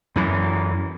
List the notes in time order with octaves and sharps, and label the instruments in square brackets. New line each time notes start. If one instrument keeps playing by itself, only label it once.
[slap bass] F#2 E3